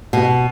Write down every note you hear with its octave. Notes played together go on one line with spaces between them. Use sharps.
B2